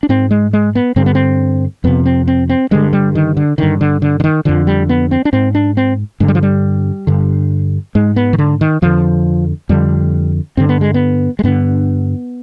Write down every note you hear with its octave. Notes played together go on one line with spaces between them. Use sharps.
D4
G#2 C4
G#3
G#3
B3
G2 D3 C4
B3
C4
F2 C3 B3
C4
C4
C4
G2 D3 G#3
G3
D#3
D3
G2 D3 D#3
D3
D3
D3
D#3
F2 D3 F3
G3
B3
C4
D4
G#2 C4
D4
C4
G2 D3 G#3
G3
F3
G3
G2 D3
G#2 G#3
B3
D#3
D3
D#3
F2 D3 F3
F2 D3 G3
G2 D3 C4
B3
G#3
B3
G#3
G2 D3 B3